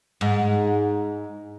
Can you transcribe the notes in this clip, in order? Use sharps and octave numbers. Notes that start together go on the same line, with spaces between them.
G#2